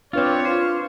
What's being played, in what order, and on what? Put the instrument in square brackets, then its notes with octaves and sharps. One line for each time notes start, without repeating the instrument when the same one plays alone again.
[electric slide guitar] C4 F4 [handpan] D4 B4 D5 [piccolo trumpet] C#5
[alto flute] F4 [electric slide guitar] C5